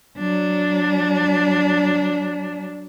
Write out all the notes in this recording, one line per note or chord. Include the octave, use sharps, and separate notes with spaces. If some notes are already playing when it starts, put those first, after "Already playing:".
F#3 D4